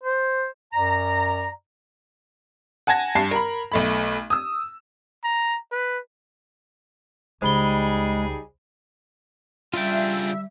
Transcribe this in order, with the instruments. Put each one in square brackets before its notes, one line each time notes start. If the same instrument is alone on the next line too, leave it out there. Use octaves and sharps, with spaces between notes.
[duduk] C5
[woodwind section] F#2 D5 A#5
[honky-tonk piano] F#5 G#5 A5 G#6 A#6
G2 A5 C7
A#4 B5
B1 A3 B5
D#6 E6
[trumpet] A#5
B4
[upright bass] C#2 [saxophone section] G3 D#4 G#4 [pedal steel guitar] G#3 [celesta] C5 B5 G7
[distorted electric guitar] C#3 D4 [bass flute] G3 [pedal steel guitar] F4 G5 [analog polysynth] E5